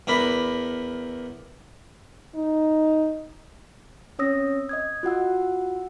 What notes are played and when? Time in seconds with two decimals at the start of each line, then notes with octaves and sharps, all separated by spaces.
0.07 E2 D4 A#4 B5
2.35 D#4
4.19 C4 C#4 C#5 D#6 E6 A#6
4.69 D#5 D#6 G#6
5.03 F4 F#4 F#5 E6